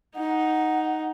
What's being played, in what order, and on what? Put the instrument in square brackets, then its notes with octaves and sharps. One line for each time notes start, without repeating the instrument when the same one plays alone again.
[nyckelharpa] D#4 [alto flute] F#5